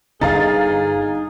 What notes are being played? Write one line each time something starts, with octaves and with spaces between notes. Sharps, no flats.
G1 G2 D3 D#4 G#4 F5 A#5 A6